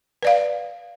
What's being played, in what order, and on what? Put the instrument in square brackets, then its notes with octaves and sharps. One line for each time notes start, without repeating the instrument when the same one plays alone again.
[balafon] B4 D5 F5